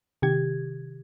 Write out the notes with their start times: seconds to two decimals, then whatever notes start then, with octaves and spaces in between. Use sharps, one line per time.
0.22 C3 D#3 G4 G#6